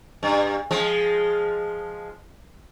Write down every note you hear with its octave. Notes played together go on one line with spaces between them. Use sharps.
G2
F3 G#3